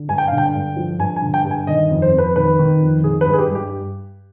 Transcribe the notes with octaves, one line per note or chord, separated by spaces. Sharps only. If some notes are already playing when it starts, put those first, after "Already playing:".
Already playing: D3
G2 G#5
G5
D3 F5
G5
G2
F3
G2 G#5
G#5
D3
G5
G2
G#5
D#3 D#5
F2
C5
F2
B4
D#3 B4
D#3
F2
D#3 G#4
B4
G2
G#4
G4
G2
G4